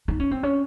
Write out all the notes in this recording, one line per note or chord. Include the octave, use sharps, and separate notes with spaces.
D#4
C#4
C4
C#4